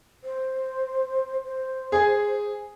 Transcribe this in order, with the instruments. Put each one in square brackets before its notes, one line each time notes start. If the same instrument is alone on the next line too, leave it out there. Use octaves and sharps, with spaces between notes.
[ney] C5
C5
[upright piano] G#4 G#5